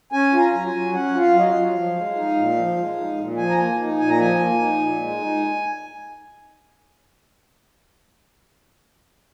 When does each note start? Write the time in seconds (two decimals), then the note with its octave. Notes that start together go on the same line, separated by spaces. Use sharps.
0.12 C#4 G#5
0.33 F4
0.39 A#5
0.54 F#3
0.66 G#5
0.74 F#3
0.94 C#4 F#5
1.14 F4
1.20 F5
1.34 F#3 D#5
1.48 F5
1.55 F#3
1.75 F3
1.95 G#3
2.16 D#4
2.36 A#2
2.56 F3
2.77 G#3
2.97 D#4
3.17 A#2
3.37 F3 G#5
3.50 A#5
3.57 A#3 G#5
3.78 D#4
3.98 A#2 G#5
4.10 A#5
4.18 F3 G#5
4.39 A#3
4.59 D#4
4.80 A#2
5.00 G#3
5.20 D#4